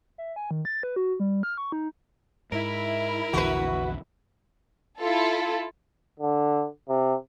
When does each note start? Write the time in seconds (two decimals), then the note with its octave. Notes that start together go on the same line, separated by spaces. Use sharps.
0.18 E5
0.36 G#5
0.51 D#3
0.65 A6
0.83 B4
0.96 F#4
1.20 G3
1.43 F6
1.58 C#6
1.72 D#4
2.52 G#2 E4 A#4
3.33 A#1 E2 D3 F#4 B4
4.99 E4 F4 A4
6.19 D3
6.89 C3